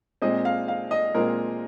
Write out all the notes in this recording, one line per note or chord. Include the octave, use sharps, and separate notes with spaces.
A#2 G#3 C4 D#5
F5
F5
D#5
A#2 G#3 C4 A#4